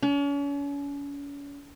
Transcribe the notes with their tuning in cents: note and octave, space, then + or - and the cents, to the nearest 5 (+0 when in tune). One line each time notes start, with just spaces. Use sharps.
C#4 +40